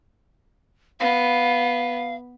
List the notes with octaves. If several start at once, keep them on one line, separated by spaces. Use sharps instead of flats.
B3 F5